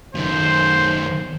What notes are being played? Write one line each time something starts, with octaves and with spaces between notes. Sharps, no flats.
F#2 D#3 C5